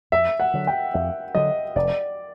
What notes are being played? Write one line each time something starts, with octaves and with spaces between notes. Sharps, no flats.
F2 E5
F#5
D3 F#3
G5
F2 E5
D3 F#3 D#5
F1 D5